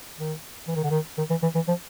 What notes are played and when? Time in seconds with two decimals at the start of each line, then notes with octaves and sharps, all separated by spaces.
0.18 D#3
0.68 E3
0.76 D#3
0.83 D3
0.90 D#3
1.18 D#3
1.30 E3
1.42 E3
1.55 E3
1.68 F3